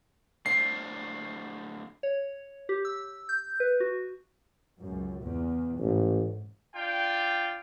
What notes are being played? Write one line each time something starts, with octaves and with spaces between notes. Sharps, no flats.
A2 D4 C5 C7
C#5
G4
E6
G6
B4
F#4
C#2 F#2
E2
A1 G#2
D4 F4 G5